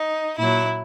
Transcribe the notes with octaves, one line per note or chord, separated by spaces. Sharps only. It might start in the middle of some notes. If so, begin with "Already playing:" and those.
Already playing: D#4
A#2 F#3 E4